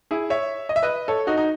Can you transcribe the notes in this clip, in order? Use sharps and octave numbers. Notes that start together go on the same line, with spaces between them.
E4 G#4
C#5 E5
D#5
E5
B4 D#5
A4 C#5
D#4 F#4
D#4